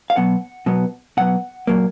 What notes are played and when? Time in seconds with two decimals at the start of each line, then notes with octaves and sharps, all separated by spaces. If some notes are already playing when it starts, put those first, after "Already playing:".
0.10 F5
0.16 B2 F#3 B3 F#5
0.66 B2 F#3 B3
1.17 B2 F#3 B3 F#5
1.67 A#2 F#3 A#3